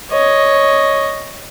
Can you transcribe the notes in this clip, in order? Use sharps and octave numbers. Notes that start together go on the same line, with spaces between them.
C#5 D#5